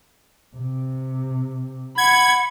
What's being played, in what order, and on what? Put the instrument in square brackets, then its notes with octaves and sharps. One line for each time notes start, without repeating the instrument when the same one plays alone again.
[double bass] C3
[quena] F#5 [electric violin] B5 [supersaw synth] G#6